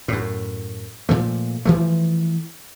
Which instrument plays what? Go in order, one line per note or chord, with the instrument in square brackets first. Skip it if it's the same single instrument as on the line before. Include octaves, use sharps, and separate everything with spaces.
[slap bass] F#2 A2
A#2 F3 A3
E3 F3 A3